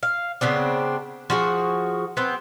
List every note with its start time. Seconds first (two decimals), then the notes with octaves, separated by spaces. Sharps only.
0.03 F5
0.41 C#3 B3 C4 D4
1.30 F3 F#4 G#4
2.17 B3 C4